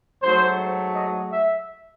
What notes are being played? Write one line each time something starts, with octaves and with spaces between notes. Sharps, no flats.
G#2 F#3 A3 C5
D#5
E5